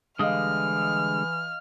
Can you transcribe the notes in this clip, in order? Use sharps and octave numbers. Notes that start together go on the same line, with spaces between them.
D3 E3 G3 G#3 D#5 F5 D#6 F6